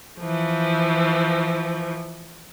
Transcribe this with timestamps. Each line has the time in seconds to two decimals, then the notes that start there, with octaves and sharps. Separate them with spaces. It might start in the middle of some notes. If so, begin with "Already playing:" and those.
0.19 E3 F3